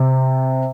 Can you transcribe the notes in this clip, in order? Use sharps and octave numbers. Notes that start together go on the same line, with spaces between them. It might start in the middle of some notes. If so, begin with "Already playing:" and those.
Already playing: C3